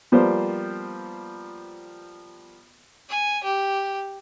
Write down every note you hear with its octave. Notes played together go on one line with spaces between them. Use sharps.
F3 G3 A#3 B3 C5
G#5
G4